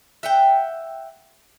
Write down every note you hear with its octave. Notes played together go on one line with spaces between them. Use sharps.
E5 F#5 G5